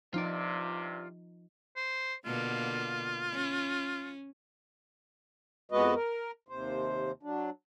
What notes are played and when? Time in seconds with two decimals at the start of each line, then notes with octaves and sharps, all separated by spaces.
0.14 G2 C3 F3 D#4 F4 D5
1.76 C5
2.25 B2 D3 A#3 F4
3.32 C#4
5.72 F2 G#3 B3 F#4 B4 D#5
5.94 A#4
6.49 D#2 C3 C5
7.23 F#3 D4